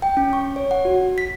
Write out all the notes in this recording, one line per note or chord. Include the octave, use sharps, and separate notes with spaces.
G5
C#4
C#6
C#5
F#5
F#4
B6